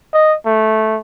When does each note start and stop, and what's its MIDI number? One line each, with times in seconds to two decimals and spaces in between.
0.13 0.35 75
0.46 0.99 57